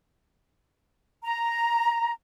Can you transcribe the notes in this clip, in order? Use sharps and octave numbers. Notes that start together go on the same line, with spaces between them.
A#5